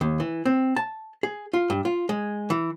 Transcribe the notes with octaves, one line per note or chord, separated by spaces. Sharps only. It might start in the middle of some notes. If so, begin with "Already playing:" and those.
D#2
E3
C4
A5
G#4
F4
G2
F4
G#3
E3